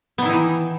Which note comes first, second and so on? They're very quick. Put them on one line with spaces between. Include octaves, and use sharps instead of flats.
B3 D#3 E4 D#4 E3